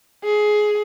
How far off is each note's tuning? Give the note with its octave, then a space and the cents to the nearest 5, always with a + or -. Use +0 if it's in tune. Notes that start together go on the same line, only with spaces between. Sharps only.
G#4 +15